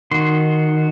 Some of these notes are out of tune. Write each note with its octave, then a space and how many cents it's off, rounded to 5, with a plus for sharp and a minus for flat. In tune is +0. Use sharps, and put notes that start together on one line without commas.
D#3 -5 F#4 +0 C6 +0